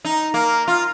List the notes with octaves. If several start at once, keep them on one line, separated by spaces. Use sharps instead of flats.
D#4
A#3
F4